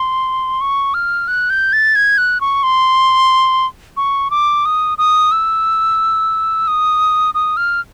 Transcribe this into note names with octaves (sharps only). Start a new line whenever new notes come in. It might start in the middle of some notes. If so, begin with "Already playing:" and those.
Already playing: C6
C#6
F6
F#6
G6
A6
G#6
F#6
C#6
C6
C#6
D6
D#6
D#6
E6
D#6
D#6
F6